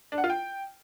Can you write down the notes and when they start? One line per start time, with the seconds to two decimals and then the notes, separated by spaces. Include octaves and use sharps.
0.12 D4
0.18 F#5
0.24 F4
0.30 G5